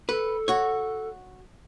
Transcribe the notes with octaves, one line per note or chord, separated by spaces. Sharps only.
A4 B4
F#4 C#5